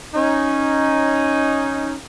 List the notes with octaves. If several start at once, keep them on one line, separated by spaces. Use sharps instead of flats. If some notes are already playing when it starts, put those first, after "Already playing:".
C#4 D#4